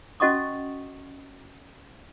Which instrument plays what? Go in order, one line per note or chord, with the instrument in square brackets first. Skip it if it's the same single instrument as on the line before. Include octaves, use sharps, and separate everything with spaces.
[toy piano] C#4 F#4 D#5 F#5 C#6 D#6